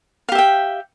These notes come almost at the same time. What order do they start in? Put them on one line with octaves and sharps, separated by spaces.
F5 G4 E5 G5